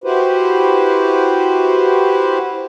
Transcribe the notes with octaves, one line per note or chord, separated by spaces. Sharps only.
E4 F#4 G4 B4 C5